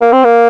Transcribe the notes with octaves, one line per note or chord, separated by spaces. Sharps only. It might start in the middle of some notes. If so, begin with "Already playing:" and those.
A#3
C4
A#3